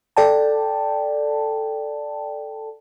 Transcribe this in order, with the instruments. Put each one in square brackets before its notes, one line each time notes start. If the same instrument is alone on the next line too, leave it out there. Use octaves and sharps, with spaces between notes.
[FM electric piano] A4 D5 G5 A5